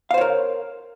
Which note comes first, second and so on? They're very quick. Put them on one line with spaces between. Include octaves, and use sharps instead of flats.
F5 C5 C#5 A#4